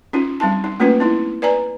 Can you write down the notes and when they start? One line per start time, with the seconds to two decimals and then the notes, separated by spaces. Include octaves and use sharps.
0.13 C#4 D#4 F4
0.40 G3 C4 D#4 A5
0.64 D#4
0.80 A3 A#3 C#4 F4 B4
1.00 C4 D#4 E4
1.42 B4 D5 G#5 A#5